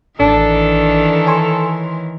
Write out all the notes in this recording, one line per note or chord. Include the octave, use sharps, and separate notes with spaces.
A1 D#3 E3 D4 A4
C#5 G#5 C6